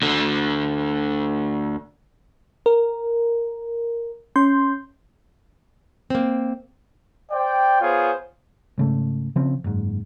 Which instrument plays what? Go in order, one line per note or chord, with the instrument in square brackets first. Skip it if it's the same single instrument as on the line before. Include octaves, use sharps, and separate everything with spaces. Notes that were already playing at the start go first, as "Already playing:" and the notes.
[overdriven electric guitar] D2 D3
[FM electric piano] A#4
C#4 C6 G6
[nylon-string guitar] A#3 C4
[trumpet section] C5 D5 G5
B3 F4 G#4 C5 C#5
[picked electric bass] G#2 C#3 A3
C#3 F3 C4
F#1 G#2